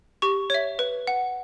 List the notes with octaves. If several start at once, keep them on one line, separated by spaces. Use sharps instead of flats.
G4 C#6
C#5 E5
B4
F#5